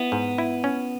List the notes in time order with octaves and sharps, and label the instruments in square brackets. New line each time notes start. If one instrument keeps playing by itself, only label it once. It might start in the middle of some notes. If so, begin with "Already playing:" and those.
Already playing: [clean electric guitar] B3 [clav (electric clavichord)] E4
[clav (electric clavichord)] G#2
E4
C#4